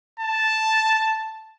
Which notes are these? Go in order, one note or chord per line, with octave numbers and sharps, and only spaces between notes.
A5